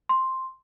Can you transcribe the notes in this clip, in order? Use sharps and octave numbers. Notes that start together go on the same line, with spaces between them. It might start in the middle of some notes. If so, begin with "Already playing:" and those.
C6